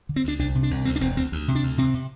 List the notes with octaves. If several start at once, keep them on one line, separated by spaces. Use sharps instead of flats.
D3
C4
D2 D4
C2 D4
C3
D4
C2
D2 C4
D4
E1 C4
D2 C4
D2
C3
D4
D2
C3 C4
C3